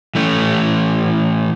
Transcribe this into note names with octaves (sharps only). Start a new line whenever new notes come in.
E3 A3 C#4